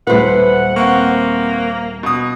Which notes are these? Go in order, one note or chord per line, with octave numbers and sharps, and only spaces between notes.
D#1 A3 G#4 B4 C5 F#5
A#3 C4 F#5 C#6
B2 D#6